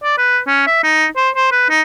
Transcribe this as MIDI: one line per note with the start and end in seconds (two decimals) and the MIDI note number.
0.04 0.16 74
0.18 0.39 71
0.47 0.65 61
0.67 0.80 76
0.83 1.06 63
1.17 1.30 72
1.36 1.50 72
1.52 1.68 71
1.70 1.82 63